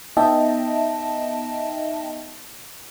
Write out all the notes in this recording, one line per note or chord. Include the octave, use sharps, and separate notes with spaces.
B3 D#4 D#5 E5 G5 A5